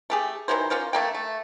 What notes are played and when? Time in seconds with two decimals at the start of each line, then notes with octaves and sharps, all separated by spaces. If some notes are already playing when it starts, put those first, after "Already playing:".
0.10 A3 G4 G#4
0.48 D#3 E3 F#3 C5
0.70 A#3 C#4 F4 C5
0.93 A3 A#3 G5
1.14 A3